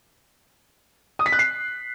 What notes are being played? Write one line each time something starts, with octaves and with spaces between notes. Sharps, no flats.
D#6
B6
F#6
C7